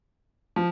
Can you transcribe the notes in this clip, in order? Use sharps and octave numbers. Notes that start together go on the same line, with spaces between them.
F3